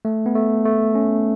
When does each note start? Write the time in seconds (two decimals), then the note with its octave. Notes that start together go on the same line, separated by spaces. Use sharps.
0.05 A3
0.26 B3
0.35 A3
0.65 A3
0.95 C#4